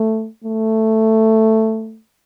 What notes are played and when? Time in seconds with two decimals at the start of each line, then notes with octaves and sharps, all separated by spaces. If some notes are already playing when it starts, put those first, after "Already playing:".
Already playing: A3
0.44 A3